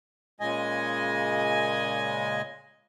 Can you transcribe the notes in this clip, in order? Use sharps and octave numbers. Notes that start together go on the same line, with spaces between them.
A#2 C#3 G#3 D#5 G#5